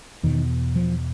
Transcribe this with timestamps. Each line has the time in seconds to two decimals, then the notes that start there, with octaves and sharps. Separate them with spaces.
0.23 E2 B2 D#3
0.76 F3